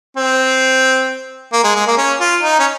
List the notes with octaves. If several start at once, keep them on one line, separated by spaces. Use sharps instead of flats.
C4
A#3
G#3
G#3
A#3
C#4
F4
D#4
C#4